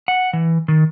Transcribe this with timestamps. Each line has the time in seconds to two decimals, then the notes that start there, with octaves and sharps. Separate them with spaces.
0.08 F#5
0.33 E3
0.68 D#3